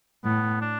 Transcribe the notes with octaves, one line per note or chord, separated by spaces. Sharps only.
A2 B3
D4